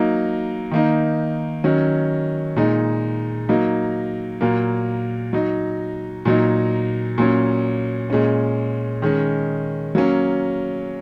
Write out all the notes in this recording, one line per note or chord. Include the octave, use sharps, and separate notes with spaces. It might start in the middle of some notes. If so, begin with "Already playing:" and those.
Already playing: F#3 A#3 D#4
D#3 A#3 D#4
D#3 F#3 C#4
A#2 G#3 D#4
F#3 A#3 D#4
A#2 F#3 A#3
F#3 D#4
A#2 F#3 D#4
A#2 F#3 C#4
A#2 G#3 C#4
D#3 G#3 C#4
F#3 A#3 C#4